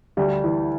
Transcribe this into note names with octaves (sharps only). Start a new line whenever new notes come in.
D2 G3
E3